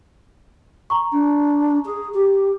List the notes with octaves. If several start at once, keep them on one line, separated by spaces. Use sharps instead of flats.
A#5 C#6
D4
G#4
G4